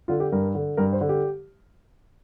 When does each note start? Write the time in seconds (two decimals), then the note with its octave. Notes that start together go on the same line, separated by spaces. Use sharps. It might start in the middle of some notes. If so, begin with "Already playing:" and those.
0.08 D3 F4
0.20 G4
0.32 G2 A#4
0.55 D3
0.77 G2 A#4
0.93 C5
1.01 D3
1.09 G4